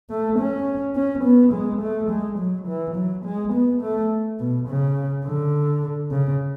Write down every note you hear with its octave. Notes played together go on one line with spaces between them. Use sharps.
A3
C#4
C#4
B3
G#3
A3
G#3
F#3
E3
F#3
G#3
B3
A3
B2
C#3
D3
C#3